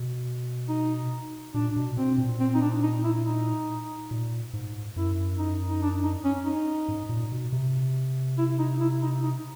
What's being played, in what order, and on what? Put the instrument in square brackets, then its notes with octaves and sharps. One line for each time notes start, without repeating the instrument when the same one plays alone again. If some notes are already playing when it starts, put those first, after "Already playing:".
Already playing: [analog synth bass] B2
[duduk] D#4
[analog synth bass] A#2 [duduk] D4
[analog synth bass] B2
[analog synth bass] B2 [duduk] C4
[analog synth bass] A#2
[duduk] C4
D#4
D4
D#4
E4
D#4
[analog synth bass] A#2
G#2
[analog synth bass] F#2 [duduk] E4
[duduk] D#4
D#4
D4
D#4
C#4
D#4
[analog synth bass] G#2
A#2
B2
C3
[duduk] E4
D#4
E4
D#4
D#4